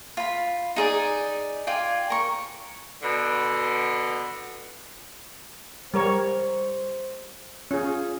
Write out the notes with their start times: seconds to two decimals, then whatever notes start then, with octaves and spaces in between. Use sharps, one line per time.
0.17 F4 B5
0.76 D#4 G#4 D5
1.67 F4 D5 G5 G#5
2.10 A#4 C#6
3.01 B2 D3
5.94 G3 A#4 C5 C#5
7.71 C#4 F4 G#4